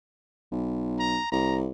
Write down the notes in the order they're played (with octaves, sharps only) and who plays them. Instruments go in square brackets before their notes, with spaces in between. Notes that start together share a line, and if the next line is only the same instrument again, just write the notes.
[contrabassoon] B1
[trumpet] A#5
[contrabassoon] C2 [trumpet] A#5